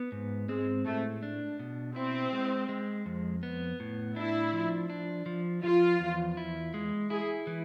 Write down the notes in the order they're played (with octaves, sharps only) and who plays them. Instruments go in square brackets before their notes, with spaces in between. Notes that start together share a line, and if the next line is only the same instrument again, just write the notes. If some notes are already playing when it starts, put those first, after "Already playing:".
Already playing: [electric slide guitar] B3
G#2
[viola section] G#3 [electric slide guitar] C4
[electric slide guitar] A2 [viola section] A3
[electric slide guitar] D4
B2
[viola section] C4 [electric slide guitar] E4
[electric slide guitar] G#3
G#3
F2
B3
A2
[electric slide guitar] D4 [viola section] E4
[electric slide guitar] F3
D4
F3
[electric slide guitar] F3 [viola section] F4
[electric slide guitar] E2
E4
G#3
[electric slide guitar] E4 [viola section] G#4
[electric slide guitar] E3